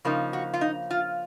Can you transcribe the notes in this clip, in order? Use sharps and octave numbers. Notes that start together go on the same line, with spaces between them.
C#3 F3 A#3 D#4
F#4
F4
D#4
F4